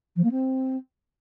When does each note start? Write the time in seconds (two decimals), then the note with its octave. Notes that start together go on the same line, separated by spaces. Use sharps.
0.16 F3
0.24 A#3
0.31 C4